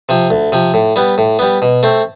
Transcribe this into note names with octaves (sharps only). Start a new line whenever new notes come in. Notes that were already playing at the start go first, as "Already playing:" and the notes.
C3 F3
D2
C3 F3
A2
G3 B3
A2
G3 B3
B2
A3 C4